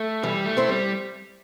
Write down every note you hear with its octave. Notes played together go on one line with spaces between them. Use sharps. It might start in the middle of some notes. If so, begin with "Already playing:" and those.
Already playing: A3
E3 G3
A3
C4 E4 C5
G3